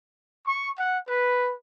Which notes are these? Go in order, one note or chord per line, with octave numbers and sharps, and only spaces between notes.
C#6
F#5
B4